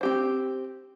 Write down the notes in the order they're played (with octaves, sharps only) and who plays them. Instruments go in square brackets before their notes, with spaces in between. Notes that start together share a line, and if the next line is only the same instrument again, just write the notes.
[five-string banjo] C4 G4 C5